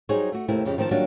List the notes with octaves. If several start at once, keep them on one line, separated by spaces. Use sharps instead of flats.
F#3 G3 D#4 G#4 C5 C#5
A3 F#4
D#2 C3 A3 E4 A#4
F2 C#3 G4
D#3 F3 C4 G#4 A5
D#3 F#3 G3 A#3 D4 F4